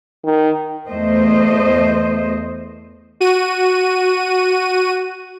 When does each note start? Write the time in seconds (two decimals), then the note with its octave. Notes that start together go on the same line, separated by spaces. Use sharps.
0.25 D#3
0.88 E2 A3 C5 D#5
3.20 F#4 D#7